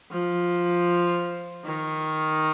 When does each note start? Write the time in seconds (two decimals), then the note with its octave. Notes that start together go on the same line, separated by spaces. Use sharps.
0.11 F3
1.64 D#3